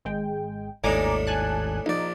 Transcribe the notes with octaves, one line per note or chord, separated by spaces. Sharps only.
G#1 G#3 G5
G#1 D#2 A2 D4 D#4 G#5 A#5 D6
G#5 A5 F#6
A#1 D#4 D5